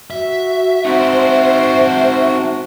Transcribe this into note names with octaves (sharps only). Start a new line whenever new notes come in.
F#4 E5
C4 D#4 F#4 C5 E5